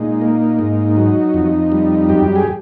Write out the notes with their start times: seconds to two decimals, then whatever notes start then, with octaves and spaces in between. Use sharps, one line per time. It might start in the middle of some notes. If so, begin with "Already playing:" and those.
Already playing: A#2 G#3 D#4
0.22 A#3
0.59 G#2
0.97 F#3
1.34 F2
1.72 G3
2.09 F#2 G4
2.36 G#4